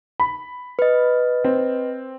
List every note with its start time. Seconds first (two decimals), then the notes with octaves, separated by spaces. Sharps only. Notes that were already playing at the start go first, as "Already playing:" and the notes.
0.20 B5
0.79 B4 D#5
1.44 C4